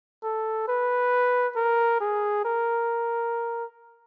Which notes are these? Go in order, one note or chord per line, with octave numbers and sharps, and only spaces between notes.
A4
B4
A#4
G#4
A#4